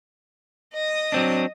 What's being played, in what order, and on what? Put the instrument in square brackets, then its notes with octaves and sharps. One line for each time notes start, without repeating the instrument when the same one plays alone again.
[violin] D#5 D#6
[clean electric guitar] F#3 C4 D4